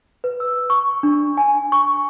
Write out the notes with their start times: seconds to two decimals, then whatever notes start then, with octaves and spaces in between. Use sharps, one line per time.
0.24 B4
0.40 E6
0.70 C#6
1.03 D4
1.37 G#5
1.72 C#6